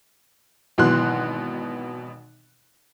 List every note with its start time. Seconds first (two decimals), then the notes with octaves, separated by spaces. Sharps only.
0.78 G#1 B2 E3 F#3 C6 F#6